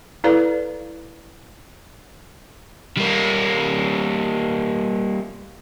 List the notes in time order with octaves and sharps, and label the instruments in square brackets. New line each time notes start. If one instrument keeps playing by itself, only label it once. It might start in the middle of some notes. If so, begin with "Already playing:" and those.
[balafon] E4 A4 B4 D5 F5 A#5
[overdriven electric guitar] G3 A#3